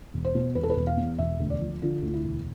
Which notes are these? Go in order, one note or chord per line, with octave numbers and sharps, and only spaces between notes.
E1
C5
B2
E1 B4
A4
B4
E1
F5
E2
E1 E5
D2
D5
F3
D3 F4
D2 F4
E4
E1